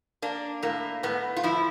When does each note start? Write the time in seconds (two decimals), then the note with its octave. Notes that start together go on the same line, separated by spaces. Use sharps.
0.22 A#3 D4
0.63 A2 A#3
1.03 A2 B3
1.37 F4
1.43 F3 E4